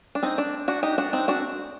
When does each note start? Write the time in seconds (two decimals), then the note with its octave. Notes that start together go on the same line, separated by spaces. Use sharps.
0.15 D4
0.23 C4 D#4
0.38 D4
0.68 D4 F#4
0.83 D#4 G4
0.98 D4 F#4
1.13 C4 D#4
1.28 D4 F#4